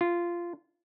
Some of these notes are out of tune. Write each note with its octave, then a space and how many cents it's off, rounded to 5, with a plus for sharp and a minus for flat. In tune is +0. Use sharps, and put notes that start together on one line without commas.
F4 -15